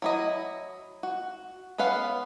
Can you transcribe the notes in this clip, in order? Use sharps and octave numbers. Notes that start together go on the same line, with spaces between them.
F#3 E4 D#5
F#4
B3 C#4 B4 F5 F#5